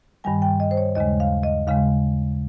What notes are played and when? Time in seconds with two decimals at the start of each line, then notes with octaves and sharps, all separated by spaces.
0.24 G2 D#3 G3 G#5
0.42 G5
0.60 D#5
0.71 C5
0.77 C#5
0.96 D#2 C#3 G#3 D#5
1.20 F5
1.43 D#5
1.67 D#2 C#3 G#3 F5